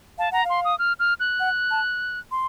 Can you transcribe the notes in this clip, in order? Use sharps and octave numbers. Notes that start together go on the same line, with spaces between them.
F5 A5
F#5 A#5
F5
C6
D#6
F6
F6
F#6
F#5
A5
C6